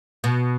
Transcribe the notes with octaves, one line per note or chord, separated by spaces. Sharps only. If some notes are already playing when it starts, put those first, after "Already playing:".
B2